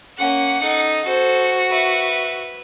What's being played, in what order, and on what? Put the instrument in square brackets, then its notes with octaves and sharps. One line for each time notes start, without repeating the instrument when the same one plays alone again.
[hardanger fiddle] A#3 C#4 [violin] F#5
[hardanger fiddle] D#4 A4
[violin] F#4 [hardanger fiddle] A4 C5
[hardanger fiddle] B4 E5